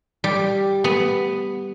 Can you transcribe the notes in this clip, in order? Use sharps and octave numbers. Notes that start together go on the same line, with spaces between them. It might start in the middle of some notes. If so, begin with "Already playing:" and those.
G3
B3